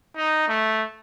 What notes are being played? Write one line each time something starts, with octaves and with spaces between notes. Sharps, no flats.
D#4
A3